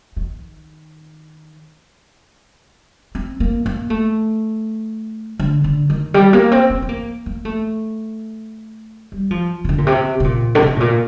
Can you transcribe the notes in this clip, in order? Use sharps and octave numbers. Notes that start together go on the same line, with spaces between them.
D#3
C4
A#3
A#3
A3
D3
D3
D#3
G3
A#3
C4
C4
C4
A#3
A#3
A3
G3
F3
C3
D3
A#2
C3
C3
A#2
D3
C3
A2
A#2